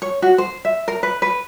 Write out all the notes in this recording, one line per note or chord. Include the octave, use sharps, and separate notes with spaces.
C#5
F#4
C5
E5
A#4
B4
B4